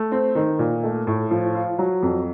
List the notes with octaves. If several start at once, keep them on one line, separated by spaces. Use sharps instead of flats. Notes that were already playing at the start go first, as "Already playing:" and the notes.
Already playing: A3
C4
D#3
A#2
A3
A2
F3
F4
F#3
F2